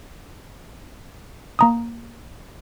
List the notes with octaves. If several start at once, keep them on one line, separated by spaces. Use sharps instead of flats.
A#3 A#5 D#6